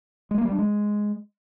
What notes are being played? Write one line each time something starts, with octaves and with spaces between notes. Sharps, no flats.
G#3
A#3
G3
D4
G#3